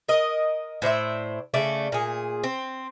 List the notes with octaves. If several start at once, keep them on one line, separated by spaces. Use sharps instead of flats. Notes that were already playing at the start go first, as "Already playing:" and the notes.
A#4 D#5
A2 C5 D5 E5
C#3 A3 D5
A#2 G#4
C4